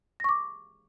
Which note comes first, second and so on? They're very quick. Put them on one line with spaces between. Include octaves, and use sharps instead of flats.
A#6 C#6 D6